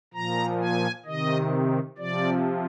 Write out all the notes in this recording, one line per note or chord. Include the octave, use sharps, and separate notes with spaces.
A#2 F3 A#5
G#5
C3 D#3 D#5
C3 F3 D5